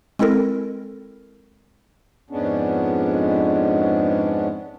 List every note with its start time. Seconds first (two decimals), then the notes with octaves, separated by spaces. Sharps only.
0.19 G#3 C4 E4 A4 A#4
2.30 F2 G#2 G#3 B3 C#4 D4